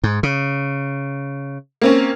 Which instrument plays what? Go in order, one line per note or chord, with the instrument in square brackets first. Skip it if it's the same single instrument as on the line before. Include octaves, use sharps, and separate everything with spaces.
[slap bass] G#2
C#3
[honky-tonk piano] A#3 C4 C#4